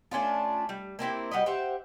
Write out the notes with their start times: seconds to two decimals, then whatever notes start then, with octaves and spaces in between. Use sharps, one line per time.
0.11 A3 C#4 D4 F4
0.69 G3
0.99 A#3 C4 E4 G4
1.31 G3 F#4 B4 D#5
1.46 G4 C5 E5 F#5